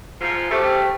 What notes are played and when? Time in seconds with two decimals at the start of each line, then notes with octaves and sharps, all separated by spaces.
0.21 G#2 F3
0.50 C#3 A3 G4 C5